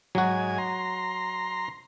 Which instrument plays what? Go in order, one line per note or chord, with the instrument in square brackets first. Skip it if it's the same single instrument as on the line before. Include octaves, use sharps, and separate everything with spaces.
[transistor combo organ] G#2 G#5 [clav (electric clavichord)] F#3 F#4
[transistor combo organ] A#5 C6